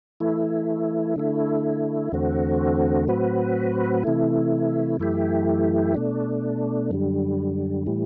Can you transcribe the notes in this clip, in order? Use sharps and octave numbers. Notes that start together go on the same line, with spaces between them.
E3 A3 E4
D3 A3 E4
E2 D3 A3 C4 F#4
A2 F#3 C4 F#4 B4
C3 E3 A3 E4
F#2 E3 A3 E4 G4
B2 A3 D4
F#2 D3 G3
A2 E3 G3